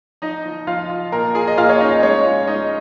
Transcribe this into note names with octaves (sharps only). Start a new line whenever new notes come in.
F3 D#4 D#5
F3
F3 F4 F5
F4
A#2 A#4 A#5
F4 G#4 G#5
D#5
A#2 F4 F5
C#5
C#4 D#4 D#5
G#3 C#4 C#5
F4
G#3 D#4 D#5